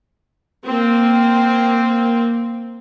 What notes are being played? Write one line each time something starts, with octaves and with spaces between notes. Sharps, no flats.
A#3 C4